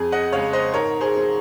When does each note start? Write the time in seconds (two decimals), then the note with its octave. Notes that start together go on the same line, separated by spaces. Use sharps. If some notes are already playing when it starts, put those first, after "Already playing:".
Already playing: F2 G#4
0.12 D#5 F#5
0.32 C#3 G#3 C#5 F5
0.53 C5 D#5
0.73 G#2 A#4 C#5
1.01 G#4 C5
1.15 F#3 C4 D#4